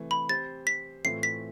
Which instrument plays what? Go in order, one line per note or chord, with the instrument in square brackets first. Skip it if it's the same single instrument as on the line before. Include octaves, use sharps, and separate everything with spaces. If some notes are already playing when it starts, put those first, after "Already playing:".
Already playing: [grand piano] C3 E3 A3
[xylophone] B5
[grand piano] C4 G4 C5 [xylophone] A6
[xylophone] B6
[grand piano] A2 E3 A3 C4 F4 [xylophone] C7
[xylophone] B6